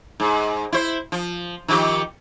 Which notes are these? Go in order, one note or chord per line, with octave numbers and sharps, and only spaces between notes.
G#2
E4 C5
F3
D#3 F3 G4